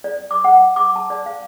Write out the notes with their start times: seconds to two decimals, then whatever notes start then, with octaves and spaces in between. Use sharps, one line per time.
0.04 D5
0.31 D6
0.44 F#5
0.76 D6
0.96 A5
1.10 D5
1.26 F5